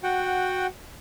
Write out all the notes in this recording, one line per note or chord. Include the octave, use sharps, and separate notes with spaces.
F#4 F#5 G5